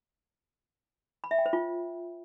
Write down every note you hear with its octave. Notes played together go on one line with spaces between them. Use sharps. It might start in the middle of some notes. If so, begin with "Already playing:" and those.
B5
E5
G5
C5
F4